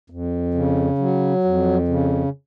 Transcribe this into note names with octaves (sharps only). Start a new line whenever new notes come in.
F2
C#3
F#3
F2
C#3